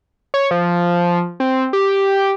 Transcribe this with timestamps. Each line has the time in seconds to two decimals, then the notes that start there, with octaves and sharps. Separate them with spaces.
0.34 C#5
0.51 F3
1.40 C4
1.73 G4